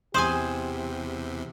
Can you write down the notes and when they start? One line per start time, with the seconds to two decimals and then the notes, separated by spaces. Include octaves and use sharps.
0.14 E2 C3 G4 C5 G#5 C6 D#6